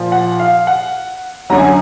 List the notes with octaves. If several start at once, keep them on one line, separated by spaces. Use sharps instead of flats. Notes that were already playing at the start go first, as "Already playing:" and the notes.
Already playing: A#2 F3
F#5
F5
F#5
F#2 D3 F#3 A#5
G#5